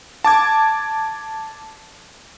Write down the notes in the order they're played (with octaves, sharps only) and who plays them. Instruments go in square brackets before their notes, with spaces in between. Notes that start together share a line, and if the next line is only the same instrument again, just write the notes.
[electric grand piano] A5 D6 G#6